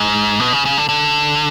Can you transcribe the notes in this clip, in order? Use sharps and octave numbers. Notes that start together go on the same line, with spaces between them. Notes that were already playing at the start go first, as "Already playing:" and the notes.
Already playing: G#2
B2
C#3
C#3
D3
D3